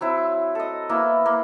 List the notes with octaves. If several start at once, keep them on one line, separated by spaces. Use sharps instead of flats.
F#3 C4 E4
A4 D#5
A#3 B3 E4
A#3